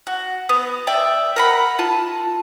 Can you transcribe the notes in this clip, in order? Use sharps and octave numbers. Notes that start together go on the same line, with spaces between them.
F#4
B3
D5 E5 G5
A#4 F#5 B5
F4 A5